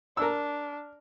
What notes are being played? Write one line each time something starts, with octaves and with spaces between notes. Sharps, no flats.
D4 A#4 E6